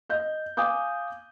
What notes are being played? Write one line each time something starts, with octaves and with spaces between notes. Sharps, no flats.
D#5 G6
F5 G#5 D6 D#6 G6